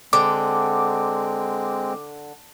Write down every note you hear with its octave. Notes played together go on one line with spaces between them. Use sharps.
D3 G#3 C4 D6